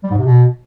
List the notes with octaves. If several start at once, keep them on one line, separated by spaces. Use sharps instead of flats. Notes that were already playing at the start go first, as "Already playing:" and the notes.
G3
G#2
C3
B2